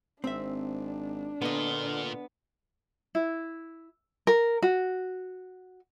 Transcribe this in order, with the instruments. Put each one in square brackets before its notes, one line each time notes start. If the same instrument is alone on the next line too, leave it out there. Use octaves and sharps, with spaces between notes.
[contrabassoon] G#1 [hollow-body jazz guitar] C4 E5 [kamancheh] D4
[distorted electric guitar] A#2 F4 [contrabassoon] D3 [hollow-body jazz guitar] B3 D#5
[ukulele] E4
A#4
F#4